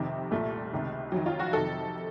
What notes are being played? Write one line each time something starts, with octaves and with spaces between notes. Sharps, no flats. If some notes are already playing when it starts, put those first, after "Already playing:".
Already playing: F2 C3 D#3
C2 A#2 A3
C#2 C3 D#3
F2 D#3 F#3
F4
F#4
F2 C3 D#3 A4